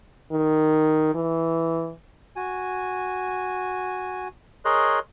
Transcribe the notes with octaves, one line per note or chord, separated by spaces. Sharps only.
D#3
E3
F#4 G#5
G#4 A#4 C#5 D#5 C6 F#6